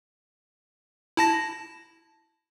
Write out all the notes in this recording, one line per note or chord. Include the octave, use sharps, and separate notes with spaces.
E4 A5 A#6